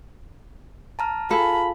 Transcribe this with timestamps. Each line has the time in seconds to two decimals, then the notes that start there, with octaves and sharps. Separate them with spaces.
0.99 A5 A#5 F6
1.31 F4 G#4 A4 B5